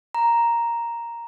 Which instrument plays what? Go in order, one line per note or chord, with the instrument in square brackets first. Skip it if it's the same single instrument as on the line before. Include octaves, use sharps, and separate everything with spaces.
[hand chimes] A#5